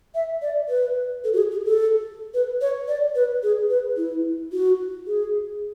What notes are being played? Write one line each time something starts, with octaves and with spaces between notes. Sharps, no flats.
E5
D5
B4
A4
F#4
G#4
G#4
A4
B4
C#5
D5
B4
G#4
B4
E4
F#4
G#4